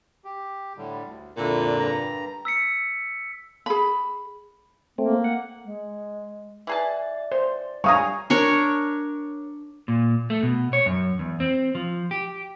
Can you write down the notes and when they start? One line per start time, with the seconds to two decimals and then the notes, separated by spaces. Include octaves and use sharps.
0.25 G4
0.77 A2 D3 G3
1.06 D2
1.38 F2 A#2 D3 E4
1.79 G2 A#5
2.45 E6 B6 C#7
3.66 G#4 B5
4.98 A3 A#3 C4
5.24 F#5
5.64 G#3
6.67 E3 G#4 D5 A5
7.32 C5
7.84 G3 C#5 F5 G#5 A#5 C#6 D#6
8.30 D4 A#4 C#5
9.88 A#2
10.30 A3
10.43 B2
10.73 C#5
10.86 F#2
11.19 E2
11.40 C4
11.75 F3
12.11 G4